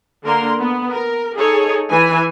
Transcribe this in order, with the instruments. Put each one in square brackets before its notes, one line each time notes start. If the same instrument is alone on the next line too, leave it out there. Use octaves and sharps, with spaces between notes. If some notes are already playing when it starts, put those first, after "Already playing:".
[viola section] D3 A#3 A#4 C6
B3
A#4
D#4 G#4 A4 C#5
E3 G#5